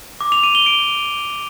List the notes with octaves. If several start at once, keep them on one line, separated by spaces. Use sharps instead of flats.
D6
F7
D#7
G7
D7